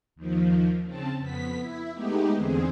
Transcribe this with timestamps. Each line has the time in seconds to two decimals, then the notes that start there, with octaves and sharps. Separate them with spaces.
0.16 D#2 D#3 F3
0.84 C#3 C4 A5
1.19 F2 B3 B6
1.58 E4
1.93 G#3 A3 B3 D#4 G4
2.35 E2 D3 C4 G#4